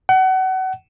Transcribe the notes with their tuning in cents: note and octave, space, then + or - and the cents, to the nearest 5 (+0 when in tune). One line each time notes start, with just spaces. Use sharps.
F#5 +30